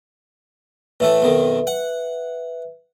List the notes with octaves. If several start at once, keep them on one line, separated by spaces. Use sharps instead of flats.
A2 E3 A3 B4 E5
B1 F2 D#3
F#5